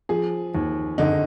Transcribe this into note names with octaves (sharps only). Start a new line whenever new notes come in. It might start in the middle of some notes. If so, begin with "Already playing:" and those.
F3 G#4
D#2
D3 D#4